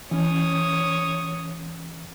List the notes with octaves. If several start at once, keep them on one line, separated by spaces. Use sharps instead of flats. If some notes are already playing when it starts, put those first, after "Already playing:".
E3 C#4 C#5 D#6